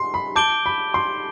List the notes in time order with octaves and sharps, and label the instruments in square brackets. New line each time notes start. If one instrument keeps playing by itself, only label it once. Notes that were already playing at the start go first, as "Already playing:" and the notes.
Already playing: [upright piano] C6
B5
[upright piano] A5 [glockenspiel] D6 G6 D7 G7
[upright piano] B5
C6